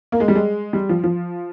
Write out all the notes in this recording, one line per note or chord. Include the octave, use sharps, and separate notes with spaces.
A#3
G#3
G3
G#3
G3
F3
F3